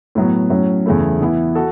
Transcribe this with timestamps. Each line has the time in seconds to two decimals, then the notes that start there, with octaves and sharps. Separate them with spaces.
0.15 A2 F#3 B3
0.50 A2 F#3 C#4
0.86 E2 C#3 A3 E4
1.20 E3 B3 E4
1.55 F#4 A4